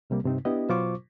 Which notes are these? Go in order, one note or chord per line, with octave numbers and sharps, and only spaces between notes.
C2 C3 G3 A#3
G2 C3 C4 D#4
B3 D4 E4 G4 D#5
B2 F#3 F4 C5 C#6 D6